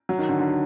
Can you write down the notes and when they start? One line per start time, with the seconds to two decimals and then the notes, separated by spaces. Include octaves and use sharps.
0.09 F#3
0.19 D#3
0.29 D3
0.39 D3